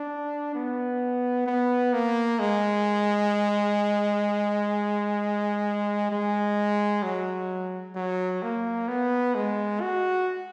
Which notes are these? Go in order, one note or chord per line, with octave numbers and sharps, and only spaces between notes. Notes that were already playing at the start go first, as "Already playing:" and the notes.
Already playing: D4
B3
B3
A#3
G#3
G#3
F#3
F#3
A#3
B3
G#3
F#4